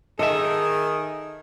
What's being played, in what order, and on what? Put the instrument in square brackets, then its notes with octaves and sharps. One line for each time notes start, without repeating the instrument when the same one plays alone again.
[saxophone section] D#3 [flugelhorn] G#4 [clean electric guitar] A4 E5 [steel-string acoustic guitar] D#5